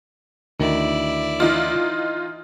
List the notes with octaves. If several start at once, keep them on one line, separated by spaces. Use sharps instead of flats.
D2 D#3 E4 D5
E3 D#4 F4